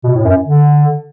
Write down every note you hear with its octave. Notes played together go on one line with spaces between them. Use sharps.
B2
A2
F#2
D3